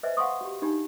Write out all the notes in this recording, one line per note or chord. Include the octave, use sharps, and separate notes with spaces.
B4 C5 D#5 E5 G#5
F5 F#5 G#5 C6 C#6 D#6
F#4 G4
D4 D#4 G4 B5